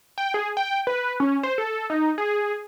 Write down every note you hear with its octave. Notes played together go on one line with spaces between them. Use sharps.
G5
G#4
G5
B4
C#4
C5
A4
D#4
G#4